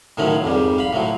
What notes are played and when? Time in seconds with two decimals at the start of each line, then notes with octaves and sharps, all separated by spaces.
0.17 A2 D#3 F3 F#3 C#4
0.44 F2 G#2 G3
0.78 F5 B5
0.93 A2 F3 F#3